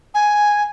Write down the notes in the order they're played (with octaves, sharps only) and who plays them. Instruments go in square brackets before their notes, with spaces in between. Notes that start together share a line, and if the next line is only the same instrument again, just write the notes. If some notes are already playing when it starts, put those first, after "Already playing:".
[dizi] G#5